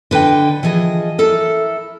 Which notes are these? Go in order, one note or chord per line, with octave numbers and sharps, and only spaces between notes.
D3 B4 D#5 G5
E3 F3 G#4 D#5
E4 A4 A#4